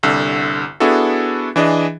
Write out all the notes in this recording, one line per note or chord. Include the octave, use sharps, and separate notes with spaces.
G1 C2 D3 E6
B3 D4 E4 F#4 G#4 A4
E3 D4 G#4 D#5